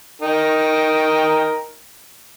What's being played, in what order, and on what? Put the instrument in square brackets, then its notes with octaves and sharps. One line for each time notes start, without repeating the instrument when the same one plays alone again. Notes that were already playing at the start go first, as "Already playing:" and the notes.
[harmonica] D#4 A#4 G5